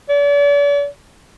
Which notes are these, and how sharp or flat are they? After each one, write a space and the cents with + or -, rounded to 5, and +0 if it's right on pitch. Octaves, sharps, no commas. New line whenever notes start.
D5 -45